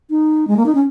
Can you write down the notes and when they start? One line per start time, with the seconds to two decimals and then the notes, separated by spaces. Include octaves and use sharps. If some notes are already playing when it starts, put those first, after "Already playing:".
0.10 D#4
0.47 G#3
0.57 A#3
0.66 D#4
0.75 C#4